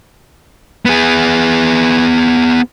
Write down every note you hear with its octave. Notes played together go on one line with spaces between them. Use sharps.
B3 G#4